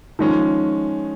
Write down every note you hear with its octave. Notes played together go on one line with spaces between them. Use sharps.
D#3 F3 G#3 C#4